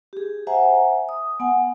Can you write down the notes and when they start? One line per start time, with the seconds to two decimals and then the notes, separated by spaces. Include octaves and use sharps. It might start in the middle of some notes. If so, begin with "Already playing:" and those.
0.13 G4 G#4
0.47 C5 E5 F#5 G#5 A#5
1.09 D#6
1.40 B3 F#5 G#5